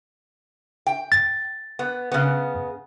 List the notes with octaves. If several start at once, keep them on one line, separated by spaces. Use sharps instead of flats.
G5
A6
B3
C#3 B3